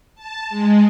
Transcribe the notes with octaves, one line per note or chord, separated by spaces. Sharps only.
A5
G#3